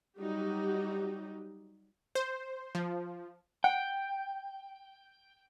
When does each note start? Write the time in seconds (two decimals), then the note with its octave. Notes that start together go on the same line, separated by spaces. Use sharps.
0.19 F#3 G3 D#4 F#4 G4
2.15 C5
2.75 F3
3.64 F#5 G5